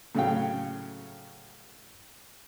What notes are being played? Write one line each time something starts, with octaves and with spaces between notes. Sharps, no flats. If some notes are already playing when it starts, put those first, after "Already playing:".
A2 C#3 F#3 C#4 F5 G5